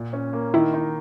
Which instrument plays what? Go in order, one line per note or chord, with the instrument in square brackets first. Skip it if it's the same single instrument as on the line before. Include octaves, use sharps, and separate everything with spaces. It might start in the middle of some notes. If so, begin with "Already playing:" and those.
Already playing: [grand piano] A#2
C#4
A#3
[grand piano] D#3 [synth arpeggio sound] E4
[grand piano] D#4